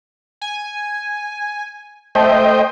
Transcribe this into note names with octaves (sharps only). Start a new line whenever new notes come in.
G#5
A3 C5 D#5 G5